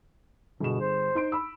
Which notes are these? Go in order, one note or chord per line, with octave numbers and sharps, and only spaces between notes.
G1 B2 G#4 E7
C5
D#4 C6 D7
B5 E6